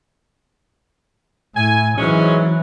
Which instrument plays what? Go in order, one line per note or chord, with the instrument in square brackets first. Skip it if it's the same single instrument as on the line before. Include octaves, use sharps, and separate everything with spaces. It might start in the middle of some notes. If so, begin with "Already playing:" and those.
[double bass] A2 [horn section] G#5
[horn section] G#2 G#3 C#4 [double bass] E3 F#3